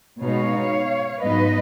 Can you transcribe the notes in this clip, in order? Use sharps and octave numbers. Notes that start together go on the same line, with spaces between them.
B2 G#3 B3 D#4 C#5 F5
G#2 F#3 B3 D#4 B4 D#5